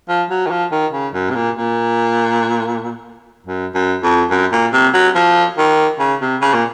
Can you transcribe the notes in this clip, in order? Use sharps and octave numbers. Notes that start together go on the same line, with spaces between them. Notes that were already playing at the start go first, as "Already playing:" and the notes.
F3
F#3
D#3
F3
D#3
C#3
F#2
C3
A#2
A#2
F#2
F#2
F2
F#2
A#2
C3
F#3
F3
D#3
C#3
C3
C#3
A#2